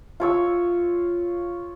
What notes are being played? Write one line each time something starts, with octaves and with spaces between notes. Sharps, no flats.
F4 C#5 E6